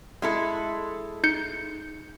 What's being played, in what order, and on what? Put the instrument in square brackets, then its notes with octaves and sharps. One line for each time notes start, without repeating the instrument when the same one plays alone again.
[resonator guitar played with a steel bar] G#3 E4 A4
[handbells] D#4 G6 C#7